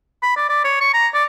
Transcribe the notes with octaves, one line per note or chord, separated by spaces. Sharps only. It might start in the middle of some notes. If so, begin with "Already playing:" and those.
B5
D5
D5
C#5
C#6
A#5
D5